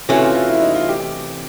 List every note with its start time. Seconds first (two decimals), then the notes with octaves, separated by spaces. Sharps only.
0.09 C3 E3 A3 C#4 F#4
0.22 F4
0.35 F4
0.49 E4
0.62 D#4
0.75 F4
0.89 G4